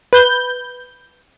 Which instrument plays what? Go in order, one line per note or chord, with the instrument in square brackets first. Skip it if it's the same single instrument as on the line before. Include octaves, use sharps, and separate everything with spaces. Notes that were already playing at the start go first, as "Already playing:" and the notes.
[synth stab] B4 G6